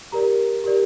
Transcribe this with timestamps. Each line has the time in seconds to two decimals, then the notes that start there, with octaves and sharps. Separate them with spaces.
0.12 G4 A#4 D5 A#5
0.64 G4 A#4 D5